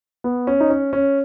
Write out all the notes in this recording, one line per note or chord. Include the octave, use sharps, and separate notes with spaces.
B3
C#4
D#4
C#4
C#4